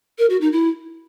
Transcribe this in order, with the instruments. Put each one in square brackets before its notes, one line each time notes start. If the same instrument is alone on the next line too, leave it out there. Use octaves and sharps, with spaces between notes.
[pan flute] A#4
F#4
D#4
E4